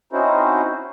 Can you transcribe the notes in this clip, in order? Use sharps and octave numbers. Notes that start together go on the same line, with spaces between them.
C4 C#4 D#4 E4 F#4 C5